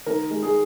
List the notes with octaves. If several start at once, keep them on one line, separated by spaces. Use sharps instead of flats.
D#3 A#4
G#3
G#4